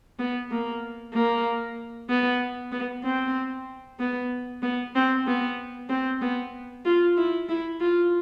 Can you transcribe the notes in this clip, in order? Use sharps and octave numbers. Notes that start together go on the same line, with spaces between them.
B3
A#3
A#3
B3
B3
C4
B3
B3
C4
B3
C4
B3
F4
E4
E4
F4